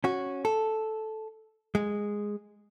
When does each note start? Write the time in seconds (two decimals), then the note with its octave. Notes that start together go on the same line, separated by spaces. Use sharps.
0.04 C#4 F#4
0.45 A4
1.75 G#3